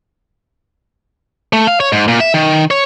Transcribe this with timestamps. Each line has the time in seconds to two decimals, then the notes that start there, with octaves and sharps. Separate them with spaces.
1.53 A3
1.67 F5
1.80 C#5
1.93 G#2
2.08 A#2
2.20 E5
2.34 D#3
2.71 C#5